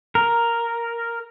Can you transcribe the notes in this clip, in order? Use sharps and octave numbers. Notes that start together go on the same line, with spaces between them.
A#4